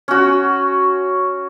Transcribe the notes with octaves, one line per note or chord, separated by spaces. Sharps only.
C#4 F#4